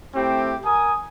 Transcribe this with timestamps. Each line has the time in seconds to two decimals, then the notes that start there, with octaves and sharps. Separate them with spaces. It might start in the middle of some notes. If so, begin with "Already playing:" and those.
0.15 A3 C4 E4 G4
0.64 A#4 G#5 D#6